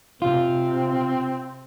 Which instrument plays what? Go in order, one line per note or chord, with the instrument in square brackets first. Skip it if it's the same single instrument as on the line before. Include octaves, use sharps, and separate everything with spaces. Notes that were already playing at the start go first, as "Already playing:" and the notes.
[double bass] C3 [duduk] C4 [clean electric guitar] F4